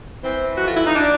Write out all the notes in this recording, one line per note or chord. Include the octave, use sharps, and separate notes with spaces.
E3 C4
F2 F#4
F4
E4
D#4
D4